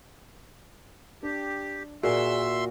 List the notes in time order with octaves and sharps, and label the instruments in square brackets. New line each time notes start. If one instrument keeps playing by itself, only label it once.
[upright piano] D4 [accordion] G4
[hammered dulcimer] A#2 [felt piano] F#4 [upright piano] G#4 A#4 [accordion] E5 C6 E6